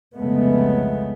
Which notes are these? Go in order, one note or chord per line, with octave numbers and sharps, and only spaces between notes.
C2 F2 C#3 G#3 A3 B3